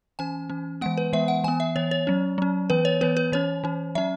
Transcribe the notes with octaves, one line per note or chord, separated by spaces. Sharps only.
E3 C#4 G#5
E3 C#4
E3 G#3 B3 F#5
B4
E3 G#3 B3 E5
F#5
E3 B3 G#5
E5
E3 B3 C#5
C#5
F#3 C#4
F#3 C#4
E3 B3 B4
C#5
E3 B3 B4
B4
E3 C#4 C#5
E3 C#4
F#3 C#4 E5